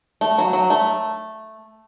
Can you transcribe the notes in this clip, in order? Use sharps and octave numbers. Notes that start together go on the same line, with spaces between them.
A3
F#3
F#3
A3